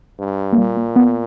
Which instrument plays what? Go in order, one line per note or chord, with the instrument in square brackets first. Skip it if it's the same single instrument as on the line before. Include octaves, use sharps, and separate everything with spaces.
[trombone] G2
[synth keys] A#3
[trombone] A#2 [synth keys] G3
[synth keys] A#3
B3